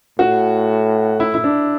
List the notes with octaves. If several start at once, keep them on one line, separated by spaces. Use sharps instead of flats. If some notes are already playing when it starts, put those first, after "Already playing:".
A2 F#4
E4
E4
D4